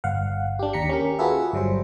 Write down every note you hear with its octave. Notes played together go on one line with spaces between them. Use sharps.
G1 F5 F#5
D4 G4
D#2 A#5 B6 C#7
C#4 G4 A#4
F4 F#4 G#4 A4 B4 E5
G1 F#3 G3 C5